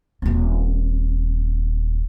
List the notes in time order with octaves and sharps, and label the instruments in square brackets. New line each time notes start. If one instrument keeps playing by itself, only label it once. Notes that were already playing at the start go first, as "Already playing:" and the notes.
[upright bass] D#1 C4